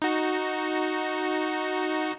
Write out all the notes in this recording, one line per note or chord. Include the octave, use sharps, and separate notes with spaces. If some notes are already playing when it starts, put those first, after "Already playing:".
D#4 F#4